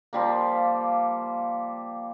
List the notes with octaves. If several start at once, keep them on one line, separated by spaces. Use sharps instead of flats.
F3 G3 A#3